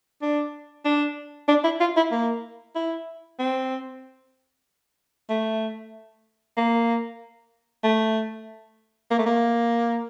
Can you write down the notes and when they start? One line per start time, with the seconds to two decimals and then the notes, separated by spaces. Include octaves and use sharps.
0.22 D4
0.85 D4
1.48 D4
1.64 E4
1.80 F4
1.97 E4
2.12 A#3
2.76 E4
3.39 C4
5.30 A3
6.57 A#3
7.84 A3
9.11 A#3
9.19 A3
9.26 A#3